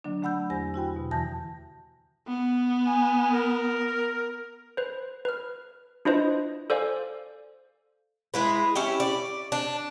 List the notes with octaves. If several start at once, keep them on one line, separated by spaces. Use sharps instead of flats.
D3 F#3 A#3 D4
D3 A3 F#5 B5 E6 G6
E2 G4 C5 G#5 A#6
E4 F#4 G5 B5
B2
E2 D3 E3 A5 G6 A#6
B3
G#5
A#4
B4 C5
B4 F6
D4 E4 F4 B4 C5 D#5
A4 C5 D5 F5 G#5
G#3 E4 B4
C#4 E4 G4
D5
D4